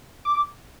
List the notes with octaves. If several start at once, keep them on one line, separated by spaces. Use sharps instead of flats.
D6